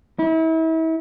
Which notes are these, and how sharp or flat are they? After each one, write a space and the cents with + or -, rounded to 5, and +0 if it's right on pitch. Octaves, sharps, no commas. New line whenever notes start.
E4 -35